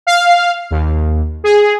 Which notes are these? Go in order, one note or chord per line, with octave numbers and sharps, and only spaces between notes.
F5
D#2
G#4